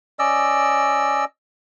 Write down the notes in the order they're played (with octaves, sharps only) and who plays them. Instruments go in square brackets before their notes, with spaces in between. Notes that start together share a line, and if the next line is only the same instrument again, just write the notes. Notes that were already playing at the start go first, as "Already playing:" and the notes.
[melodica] C#4 D5 D#5 E6